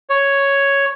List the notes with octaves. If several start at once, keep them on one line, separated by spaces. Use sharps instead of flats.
C#5